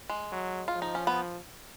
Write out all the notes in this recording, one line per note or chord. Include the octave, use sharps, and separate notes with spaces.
G#3
F#3
F4
F3
D#4
C#4
B3